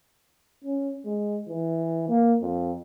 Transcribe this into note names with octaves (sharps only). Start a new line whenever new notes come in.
C#4
G#3
E3
A#3
F2